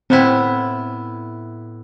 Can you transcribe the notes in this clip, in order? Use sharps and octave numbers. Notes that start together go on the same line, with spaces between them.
A2 B3 C4 E4